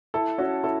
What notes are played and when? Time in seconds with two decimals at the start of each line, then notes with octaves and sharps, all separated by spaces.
0.14 E4 A4
0.38 C#4 F#4
0.64 E4 A4